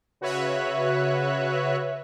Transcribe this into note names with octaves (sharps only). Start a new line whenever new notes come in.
C#3 F#4 B4 C#5 E5 F#6